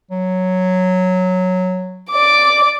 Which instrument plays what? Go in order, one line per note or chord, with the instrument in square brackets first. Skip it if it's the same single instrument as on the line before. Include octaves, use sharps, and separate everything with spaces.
[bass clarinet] F#3
[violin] D5 D6